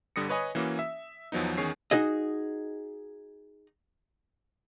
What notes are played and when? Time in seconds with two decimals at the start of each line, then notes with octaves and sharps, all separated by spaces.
0.16 G1 D3 G3 D#6 A#6 C#7
0.29 B4 C#5 D#5 G#5 B5
0.55 E3 A#3 C#4 F#4
0.79 E5
1.32 E2 F3 F#3 B3 D#4
1.57 E2 D#3 C#4 G#4 C#5 C7
1.91 D#4 F#4 G#4 D#5